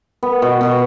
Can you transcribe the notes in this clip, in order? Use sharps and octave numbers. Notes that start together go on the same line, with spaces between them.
B3
B2
B2